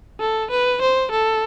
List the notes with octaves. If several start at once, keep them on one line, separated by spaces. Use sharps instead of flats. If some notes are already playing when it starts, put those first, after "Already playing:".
A4
B4
C5
A4